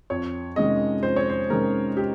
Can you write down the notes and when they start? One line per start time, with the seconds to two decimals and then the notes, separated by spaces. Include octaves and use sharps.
0.10 F2 C#5
0.56 C3 D#3 G#3 C#4 D#5
1.03 F2 C5
1.16 C#5
1.30 C5
1.49 C3 D#3 G#3 C#4 A#4
1.97 G4